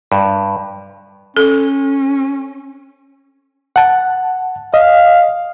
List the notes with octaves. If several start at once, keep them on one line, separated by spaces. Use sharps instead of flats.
G2
C#4 A4
F#5 A5
D#5 F5